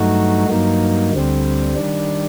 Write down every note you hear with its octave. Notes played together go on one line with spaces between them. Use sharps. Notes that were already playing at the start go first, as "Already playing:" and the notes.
Already playing: G2 F#3 A3 D#4 F#4
G2 F#3 A#3 D#4
D2 D3 G3 C4
D#3 G3 D4